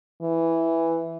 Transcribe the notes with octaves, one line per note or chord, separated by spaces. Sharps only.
E3